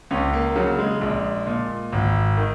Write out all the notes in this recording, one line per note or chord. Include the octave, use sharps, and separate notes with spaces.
C#2 C#4
A#3
C#3 F#3
G#3
A#1
A#2
G#1
D#3